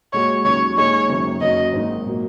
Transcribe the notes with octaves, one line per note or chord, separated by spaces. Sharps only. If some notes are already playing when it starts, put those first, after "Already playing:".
A#2 G#3 F#4 C#5
D#2 C#3 F#3 C#5
A#2 G#3 D#4 G#4 C#5
F#1 F#2 D#3
F#1 F#2 F#3 D#5
G#1 G#2 D#3 A#3 D#4
A#2 F#3 A#3